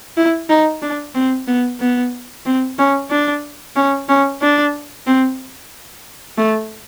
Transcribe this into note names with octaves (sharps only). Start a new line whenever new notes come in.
E4
D#4
D4
C4
B3
B3
C4
C#4
D4
C#4
C#4
D4
C4
A3